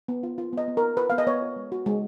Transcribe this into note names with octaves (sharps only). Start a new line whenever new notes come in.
B3
F4
F4
B3 D#5
B3
A#4
F4
F4 B4
B3 F5
D#5
B3 C#5
F4
G#3
F#4
G#3